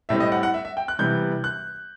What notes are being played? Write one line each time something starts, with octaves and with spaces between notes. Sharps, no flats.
A2 G3 C4 E5
D#5
F#5
F#5
E5
E5
G5
F#6
C3 E3 G3 B3 G6
F#6